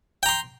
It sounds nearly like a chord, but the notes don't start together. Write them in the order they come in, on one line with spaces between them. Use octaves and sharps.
G5 A#5 C6